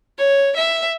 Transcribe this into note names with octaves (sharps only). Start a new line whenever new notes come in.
C#5
E5